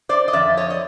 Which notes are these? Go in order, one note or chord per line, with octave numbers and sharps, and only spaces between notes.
C5 D5
D#5
F2 D3 F3 D5 E5
C#5 D#5
D#5